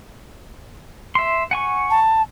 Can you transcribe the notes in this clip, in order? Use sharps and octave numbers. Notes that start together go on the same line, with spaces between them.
E5 C6
F#5 G#5 C#6
A5